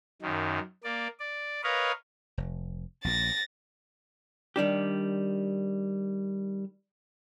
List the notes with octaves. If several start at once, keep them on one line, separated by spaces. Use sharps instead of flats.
F#2 D#3
A#3 D5
D5
A#4 B4 C#5 D#5 F5
F1
A#1 A#2 A6 A#6
D#3 G3 D4 G4